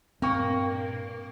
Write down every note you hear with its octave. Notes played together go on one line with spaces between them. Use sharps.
G2 A#2 A#3 C4 G5 C#6